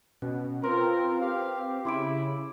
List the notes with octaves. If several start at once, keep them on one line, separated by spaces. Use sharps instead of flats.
B2 C#4
C4 F4 A#4 B4 C6
G4 F5
C#3 E4 C6 D6 D7